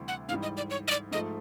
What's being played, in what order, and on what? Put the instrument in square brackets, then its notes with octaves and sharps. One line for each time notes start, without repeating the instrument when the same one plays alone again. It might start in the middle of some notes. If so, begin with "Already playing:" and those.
Already playing: [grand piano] D2 C3 E3 G3
[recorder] F#5
[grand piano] G#2 [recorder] F5
[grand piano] E3 G3
[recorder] D#5
D5
C#5
D#5
D5
[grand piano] G#2 F3 A3 [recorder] D#5